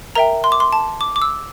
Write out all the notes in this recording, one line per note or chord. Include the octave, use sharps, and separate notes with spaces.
A#4 E5 G5 A#5
C6
D6
C6
A5
D6
D6
E6